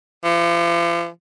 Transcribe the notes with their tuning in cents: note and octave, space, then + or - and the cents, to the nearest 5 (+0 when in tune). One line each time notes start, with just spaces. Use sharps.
F3 -40